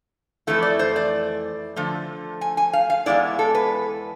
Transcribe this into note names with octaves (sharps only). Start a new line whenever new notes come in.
F2 E3 A3 E4
D5
C5
D5
D3 F3 A3
G#5
G#5
F5
F5
E2 C3 G#3 B3 E4 D5
A4
B4